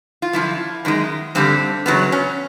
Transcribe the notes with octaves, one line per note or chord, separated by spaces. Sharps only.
F4
F#2 D3 F3 E4
F#2 D#3 G#3
G2 D3 G3 C4
F#2 C#3 F#3 B3
C#4